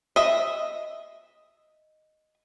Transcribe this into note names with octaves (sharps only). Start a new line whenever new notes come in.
D#5 E5